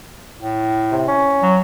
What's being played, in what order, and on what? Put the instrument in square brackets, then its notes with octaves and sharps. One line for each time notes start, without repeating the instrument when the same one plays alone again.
[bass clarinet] A2
[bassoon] C3
C#4
[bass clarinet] F#3